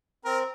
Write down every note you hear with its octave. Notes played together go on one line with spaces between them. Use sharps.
C4 A#4